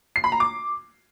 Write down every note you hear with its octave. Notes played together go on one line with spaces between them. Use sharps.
C7
B5
A#5
D6